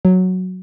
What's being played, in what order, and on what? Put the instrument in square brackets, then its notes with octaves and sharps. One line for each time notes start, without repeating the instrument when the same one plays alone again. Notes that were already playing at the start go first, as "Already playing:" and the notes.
[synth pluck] F#3